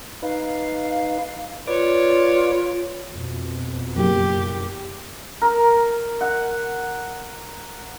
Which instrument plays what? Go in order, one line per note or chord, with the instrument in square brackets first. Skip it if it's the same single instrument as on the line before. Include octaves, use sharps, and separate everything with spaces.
[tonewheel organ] D#4 B4 [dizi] F5
[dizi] F4 [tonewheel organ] B4 D5 D6 [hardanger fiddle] C#5
[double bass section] F2 B2
[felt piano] F#1 [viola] G4
[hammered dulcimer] A#4
F#5